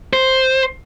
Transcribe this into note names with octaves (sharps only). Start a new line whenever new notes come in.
C5